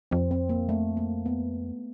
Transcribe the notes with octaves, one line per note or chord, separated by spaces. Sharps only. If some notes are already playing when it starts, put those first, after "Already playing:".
F2 C4
C4
A#3
A3
A#3
B3